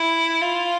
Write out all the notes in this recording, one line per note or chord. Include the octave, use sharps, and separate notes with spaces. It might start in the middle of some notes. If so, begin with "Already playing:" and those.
Already playing: E4
F4